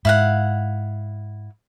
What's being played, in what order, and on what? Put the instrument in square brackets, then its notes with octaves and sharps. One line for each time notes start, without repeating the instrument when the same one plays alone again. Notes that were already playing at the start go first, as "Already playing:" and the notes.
[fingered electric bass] G#2 [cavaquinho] E4 F5 F#5